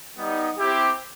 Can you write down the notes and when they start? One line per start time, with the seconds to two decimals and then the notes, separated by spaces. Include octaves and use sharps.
0.16 G3 B3 D#4
0.57 C4 E4 G4